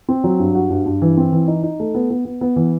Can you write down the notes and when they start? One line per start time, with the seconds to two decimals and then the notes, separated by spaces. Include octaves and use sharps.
0.08 C4
0.24 F#3
0.39 G2
0.55 F#4
0.70 G2
0.86 G2
1.02 E3
1.17 C4
1.32 E3
1.48 D#4
1.63 D#4
1.80 A3
1.95 B3
2.10 B3
2.25 B3
2.41 B3
2.56 E3